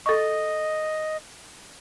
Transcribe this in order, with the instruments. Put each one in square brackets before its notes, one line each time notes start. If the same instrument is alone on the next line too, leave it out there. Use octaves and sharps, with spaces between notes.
[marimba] A4 C#6 [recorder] D#5